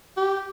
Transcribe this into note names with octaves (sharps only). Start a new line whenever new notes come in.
G4